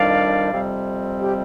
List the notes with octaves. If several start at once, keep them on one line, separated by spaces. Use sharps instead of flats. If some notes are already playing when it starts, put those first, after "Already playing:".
Already playing: F2 D#3 G3 D4 D5 F5
F2 C3 G3 C4
G4